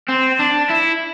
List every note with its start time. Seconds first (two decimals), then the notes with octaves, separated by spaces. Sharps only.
0.09 C4
0.40 D4
0.70 E4